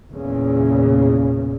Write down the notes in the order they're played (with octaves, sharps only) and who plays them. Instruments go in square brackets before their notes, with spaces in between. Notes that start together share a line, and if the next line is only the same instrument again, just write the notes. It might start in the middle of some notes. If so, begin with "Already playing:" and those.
[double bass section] E2 A#2 C#3